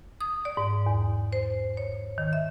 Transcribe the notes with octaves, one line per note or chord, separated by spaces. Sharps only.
D#6
D5
G#2
E2
C5
C#5
D#3
E5